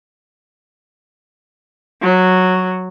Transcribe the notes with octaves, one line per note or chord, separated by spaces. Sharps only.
F#3